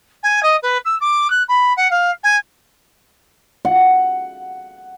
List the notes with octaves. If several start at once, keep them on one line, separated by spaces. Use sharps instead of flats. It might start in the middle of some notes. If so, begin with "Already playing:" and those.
G#5
D#5
B4
E6
D6
F#6
B5
F#5
F5
G#5
F#5